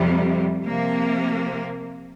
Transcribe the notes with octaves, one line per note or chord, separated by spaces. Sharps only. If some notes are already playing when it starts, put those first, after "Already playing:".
Already playing: F2 C3 G3
C3 F3 A#3